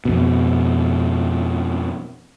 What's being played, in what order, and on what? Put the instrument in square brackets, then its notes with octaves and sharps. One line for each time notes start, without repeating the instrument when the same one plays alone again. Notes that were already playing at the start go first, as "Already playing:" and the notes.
[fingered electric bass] F2 B2